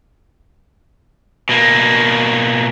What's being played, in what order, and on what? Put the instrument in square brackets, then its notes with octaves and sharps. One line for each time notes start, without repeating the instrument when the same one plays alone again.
[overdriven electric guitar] B2 A#3